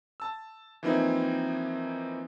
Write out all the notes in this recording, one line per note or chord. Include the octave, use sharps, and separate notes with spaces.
A5 E6
E3 F3 A#3 C4 D#4 E4